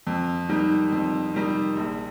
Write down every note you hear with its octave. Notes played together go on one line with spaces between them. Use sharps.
F2
D#3 G3 D#4
F2
D#3 G3 D#4
A#1